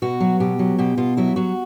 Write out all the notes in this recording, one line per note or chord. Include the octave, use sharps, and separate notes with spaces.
B2 F#4
F#3
B2 G4
F#3
B2 G4
B2 F4
F#3 E4
F#3 F#4